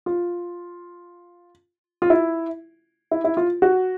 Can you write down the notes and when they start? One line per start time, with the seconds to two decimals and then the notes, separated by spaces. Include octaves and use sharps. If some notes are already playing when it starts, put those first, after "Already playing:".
0.06 F4
2.02 F4
2.10 E4
3.11 E4
3.24 E4
3.37 F4
3.62 F#4